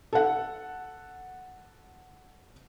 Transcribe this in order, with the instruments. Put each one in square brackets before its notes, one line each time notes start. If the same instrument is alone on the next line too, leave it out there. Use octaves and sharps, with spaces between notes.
[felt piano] A4 F#5